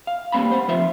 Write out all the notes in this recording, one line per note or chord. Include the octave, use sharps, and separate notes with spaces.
F5
G3 A#3 C4 A5 B5
C5 F#5
F3 F4 C5 E5